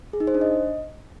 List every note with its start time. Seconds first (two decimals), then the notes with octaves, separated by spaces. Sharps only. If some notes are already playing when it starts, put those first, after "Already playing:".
0.13 G#4
0.20 D#4
0.27 C5
0.34 D4
0.41 D#5